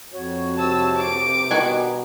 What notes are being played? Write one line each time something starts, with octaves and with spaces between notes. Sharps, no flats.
F2 F#4 C#5
C3 A5 E6
D6 D7
G2 B2 D#3 F#4 G#5